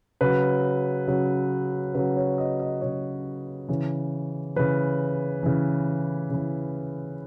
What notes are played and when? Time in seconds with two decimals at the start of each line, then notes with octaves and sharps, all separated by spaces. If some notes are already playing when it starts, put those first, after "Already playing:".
0.21 C#3 F#3 B4
1.08 C#3 F#3
1.94 C#3 F#3 B4
2.16 C#5
2.38 D#5
2.60 D#5
2.81 C#3 F#3 C#5
3.69 C#3 E3
4.56 C#3 E3 B4
5.43 C#3 E3
6.30 C#3 E3